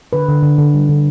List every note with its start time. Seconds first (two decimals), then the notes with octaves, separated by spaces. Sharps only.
0.13 D3 B4
0.28 D3
0.43 D3
0.59 D3
0.74 G3
0.89 D3